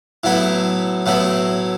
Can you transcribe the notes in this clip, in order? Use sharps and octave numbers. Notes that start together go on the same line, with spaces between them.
A2 F#3 B3 E4
A2 F#3 B3 E4